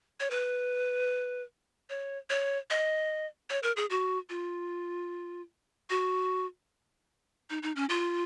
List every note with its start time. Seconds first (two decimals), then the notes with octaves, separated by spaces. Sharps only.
0.20 C#5
0.30 B4
1.90 C#5
2.30 C#5
2.70 D#5
3.50 C#5
3.63 A#4
3.76 G#4
3.90 F#4
4.29 F4
5.90 F#4
7.50 D#4
7.63 D#4
7.76 C#4
7.89 F4